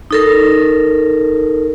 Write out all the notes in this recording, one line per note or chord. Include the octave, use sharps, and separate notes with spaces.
D#4 A4 A#4